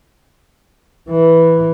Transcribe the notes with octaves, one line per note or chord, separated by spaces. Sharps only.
E3